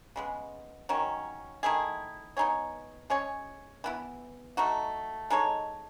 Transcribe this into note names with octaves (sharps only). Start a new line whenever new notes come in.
C#3 G#3 B3
D#3 F#3 C#4
D#3 A3 E4 G#4
B3 D#4 G#4 C#5
G#3 C#4 G#4 C#5
E3 B3 E4
A3 D#4 F#4
G#3 D#4 A4 C#5